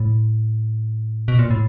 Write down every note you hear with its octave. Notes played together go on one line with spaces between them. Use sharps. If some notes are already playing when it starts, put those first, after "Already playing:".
Already playing: A2
B2
A#2
A2